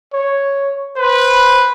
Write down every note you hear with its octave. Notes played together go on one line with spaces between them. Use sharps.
C#5
B4 C5